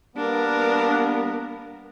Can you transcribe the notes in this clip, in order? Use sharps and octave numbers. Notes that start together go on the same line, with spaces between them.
G3 A#3 B3 D4 A#4